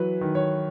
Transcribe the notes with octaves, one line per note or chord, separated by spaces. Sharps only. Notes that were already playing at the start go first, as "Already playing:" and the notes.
Already playing: E3 F#3 B4
D#3
C#5